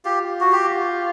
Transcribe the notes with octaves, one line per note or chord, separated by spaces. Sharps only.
F4 G4
F#4
G4